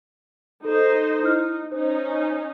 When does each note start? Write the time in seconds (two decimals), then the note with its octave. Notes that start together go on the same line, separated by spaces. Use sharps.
0.65 D#4 A4 C5 D#5
1.23 D#4 E4 F6
1.72 C#4 D#4 C5